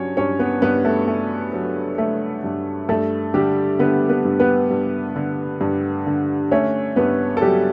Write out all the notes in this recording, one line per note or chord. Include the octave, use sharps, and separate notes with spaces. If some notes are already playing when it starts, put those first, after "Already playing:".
Already playing: G2 F#3 C#4 C#5
G2 C#4 C#5
B3 B4
G2 B3 B4
A3 A4
A3
F#3
A3
G2
G2 A3 A4
D3 G3 G4
D3 B3 B4
B3 B4
G2
B3 B4
G2
D3
G2
D3
A3 C#4 C#5
G2 B3 B4
A4
F#3 G3 G4